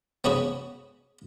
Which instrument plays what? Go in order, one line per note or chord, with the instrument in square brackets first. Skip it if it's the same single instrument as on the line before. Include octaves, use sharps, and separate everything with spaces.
[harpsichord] B3 C#4 F#4 G#4 B4 C#5